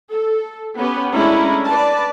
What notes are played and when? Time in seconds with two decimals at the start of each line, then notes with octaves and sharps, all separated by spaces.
0.11 A4
0.78 B3 C#4 G4 B4
1.13 G#3 A3 C#4 D4 E4 A#5
1.65 B4 D5 A5